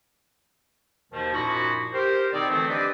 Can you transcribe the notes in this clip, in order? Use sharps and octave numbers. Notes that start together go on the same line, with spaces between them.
D#2 G#2 B2 D#3 F3
F#2 A#2 F3 D#4 E4 F#4
G4 A#4 C5
B2 D#3 C4 D#4 G#4 D5
D3 E3 F3 A3 C4
D4 G4 B4 C5 D5 D#5